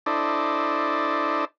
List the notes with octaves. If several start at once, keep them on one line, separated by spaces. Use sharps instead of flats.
D4 E4 A4 C5 D5 D#5